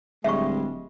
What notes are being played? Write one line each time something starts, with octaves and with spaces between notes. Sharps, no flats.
D1 G3 G#3 E5 C#6